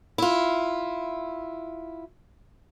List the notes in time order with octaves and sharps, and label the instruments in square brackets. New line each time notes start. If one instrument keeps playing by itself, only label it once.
[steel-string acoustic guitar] E4 F4